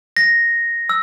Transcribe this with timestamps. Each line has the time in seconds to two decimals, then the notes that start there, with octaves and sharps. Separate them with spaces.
0.17 A#6
0.89 E6